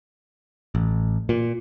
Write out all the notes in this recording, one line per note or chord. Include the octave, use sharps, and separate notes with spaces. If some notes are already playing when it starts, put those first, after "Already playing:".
A1
A#2